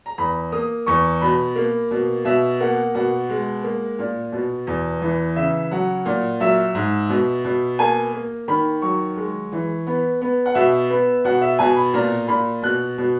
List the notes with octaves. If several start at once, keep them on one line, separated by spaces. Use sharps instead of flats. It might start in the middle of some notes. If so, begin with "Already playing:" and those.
A#5
E2 B5
A#3 D#6
E2 C#6
B2 B5
A#3
B2
B2 E5
A#3 F#5
B2 F#5
G#3
A#3
A#2
B2
E2
E3
C#3 E5
F#3 F#5
A#2
F#3 E5
G#2
B2
B2
A#3 G#5
A#3
D#3 B5
F#3 C#6
G#3
E3
B3
B3
F#5
B2 E5
B3
B2 F#5
E5
B2 G#5
B5
A#2 A#5
A#2 B5
B2 F#6
B2